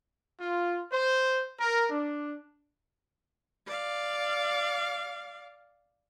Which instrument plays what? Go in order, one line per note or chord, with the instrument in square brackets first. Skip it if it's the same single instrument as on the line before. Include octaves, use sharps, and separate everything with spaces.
[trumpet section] F4
C5
A#4
D4
[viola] D5 F5